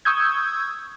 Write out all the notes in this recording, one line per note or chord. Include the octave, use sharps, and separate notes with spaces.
C#6 D#6 E6 G6 G#6